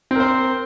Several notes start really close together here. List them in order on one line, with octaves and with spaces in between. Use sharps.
C4 A#4 C5